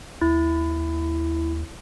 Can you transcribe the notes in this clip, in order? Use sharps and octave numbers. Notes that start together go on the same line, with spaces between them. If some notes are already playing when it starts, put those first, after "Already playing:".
D#2 E4